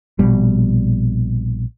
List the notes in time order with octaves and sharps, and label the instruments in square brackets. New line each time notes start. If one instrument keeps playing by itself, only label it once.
[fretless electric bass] A#1 B2 G3